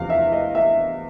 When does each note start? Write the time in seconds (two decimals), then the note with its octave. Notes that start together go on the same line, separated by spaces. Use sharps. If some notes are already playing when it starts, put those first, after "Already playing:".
Already playing: E2 C3 F3 F5
0.10 E5
0.32 D#5
0.55 E5